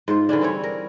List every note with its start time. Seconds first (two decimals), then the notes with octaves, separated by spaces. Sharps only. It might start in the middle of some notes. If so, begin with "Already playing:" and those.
0.08 G#2 F4 C5
0.29 D3 E3 C#4 D4
0.41 G3 C4 E4 C#5
0.63 A#4